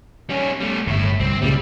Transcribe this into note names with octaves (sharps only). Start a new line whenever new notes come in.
G3 C#4
G3 A3
D1 G1 A2 E4
C2 C4
C#2 A#2 C#3 G3